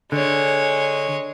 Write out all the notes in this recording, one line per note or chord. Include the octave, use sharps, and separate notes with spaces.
D3 G#3 C#5